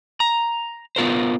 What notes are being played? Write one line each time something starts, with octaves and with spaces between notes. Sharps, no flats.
A#5
B3 F4 A#4 C5